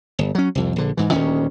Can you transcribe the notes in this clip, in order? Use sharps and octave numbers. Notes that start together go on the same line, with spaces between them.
G1
F#3 C#4
C2 F2
A#1 D3
G#2 E3
D#1 D2 D#3 C#4